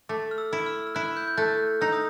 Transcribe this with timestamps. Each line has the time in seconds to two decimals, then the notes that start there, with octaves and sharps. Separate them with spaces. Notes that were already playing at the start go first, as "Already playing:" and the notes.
0.09 A3 D6
0.31 F6
0.38 E6
0.53 E4
0.66 F6
0.79 E6
0.87 F6
0.95 E4 F#6
1.17 G6
1.28 G6
1.37 A3 F#6
1.81 D#4 E6
1.93 D#6